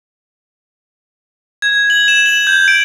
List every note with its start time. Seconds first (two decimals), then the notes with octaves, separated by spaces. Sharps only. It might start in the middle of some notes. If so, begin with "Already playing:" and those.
1.62 G#6
1.90 F#7
2.08 E7
2.26 F#7
2.47 G6
2.68 D7